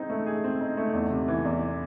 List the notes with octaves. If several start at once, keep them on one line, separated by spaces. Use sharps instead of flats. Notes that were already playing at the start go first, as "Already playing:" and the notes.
Already playing: C4 D#4 G#4
A3
G#4
C4
D#4
A3
E2
C3
E3
E2